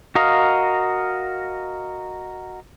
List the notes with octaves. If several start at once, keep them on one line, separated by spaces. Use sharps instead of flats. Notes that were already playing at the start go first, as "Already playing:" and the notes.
F#4 A#4 D#5 F5